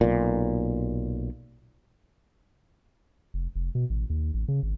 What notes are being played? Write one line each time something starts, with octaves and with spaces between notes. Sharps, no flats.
B1 A#2
F1
F1
B2
A1
D#2
A1
C#3
G#1